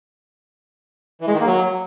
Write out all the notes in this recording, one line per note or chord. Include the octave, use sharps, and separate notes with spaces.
E3
G#3
D#3
A#3
F#3